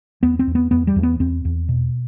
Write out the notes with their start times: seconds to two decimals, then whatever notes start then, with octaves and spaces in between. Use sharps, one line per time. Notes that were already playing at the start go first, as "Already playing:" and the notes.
0.23 E2 B3
0.39 C4
0.47 E2
0.55 B3
0.71 E2 B3
0.87 G3
0.96 E2
1.03 B3
1.20 E2 C4
1.45 E2
1.69 B2